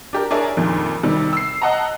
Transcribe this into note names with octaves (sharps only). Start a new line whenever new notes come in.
D4 G4 A#4
D4 G#4 A#4 C#5 E5 G#5
F2 A#2 D#3
C3 D#3 G3
E6 C7
D#5 F#5 A5 A#5